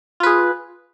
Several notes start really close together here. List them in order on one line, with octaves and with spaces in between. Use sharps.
F4 B4 G#4